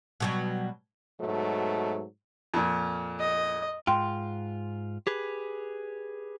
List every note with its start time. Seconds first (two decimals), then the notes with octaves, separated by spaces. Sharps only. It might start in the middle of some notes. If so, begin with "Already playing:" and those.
0.20 B2 F#3 G3
1.21 G#2 B2 F#3 A3
2.54 F2 A#2
3.20 D#5
3.87 G#2 F4 G5 C6
5.07 G4 G#4 B4